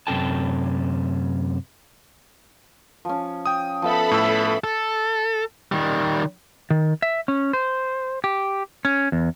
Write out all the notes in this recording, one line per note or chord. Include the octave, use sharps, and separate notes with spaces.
F#2 C3 C#4 A4 G5 A5
F3 C#4
G5 D#6
F3 B3 A4 E5 B5
A2 A5 E6
A4
D#3 G3
D#3
E5
C#4
C5
G4
C#4
E2